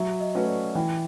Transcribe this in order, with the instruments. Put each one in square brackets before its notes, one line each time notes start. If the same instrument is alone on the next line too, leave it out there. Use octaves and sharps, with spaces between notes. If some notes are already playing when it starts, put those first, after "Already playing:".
Already playing: [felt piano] F#3 [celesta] E5
[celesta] D#5
[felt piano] A3 C#4 F#4 B4
[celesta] D5
[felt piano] E3 [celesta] G5